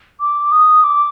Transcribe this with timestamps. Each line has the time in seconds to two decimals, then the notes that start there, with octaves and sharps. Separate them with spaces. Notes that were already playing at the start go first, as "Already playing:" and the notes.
0.20 D6
0.51 D#6
0.83 D6